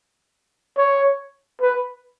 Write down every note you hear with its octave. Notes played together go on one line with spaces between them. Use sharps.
C#5
B4